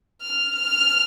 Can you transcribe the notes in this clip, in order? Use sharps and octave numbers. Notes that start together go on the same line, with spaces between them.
F6
F6